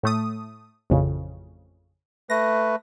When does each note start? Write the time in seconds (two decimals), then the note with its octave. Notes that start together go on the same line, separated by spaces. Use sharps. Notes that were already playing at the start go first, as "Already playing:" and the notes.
0.03 A2 A3 D#6
0.90 A1 F2 C#3
2.30 A3 B4 A#6